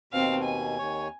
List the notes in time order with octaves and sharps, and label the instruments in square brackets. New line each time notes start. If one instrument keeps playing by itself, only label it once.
[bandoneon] D#2 B2 [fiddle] C4 F5
[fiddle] G#5
[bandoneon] D#2 C#5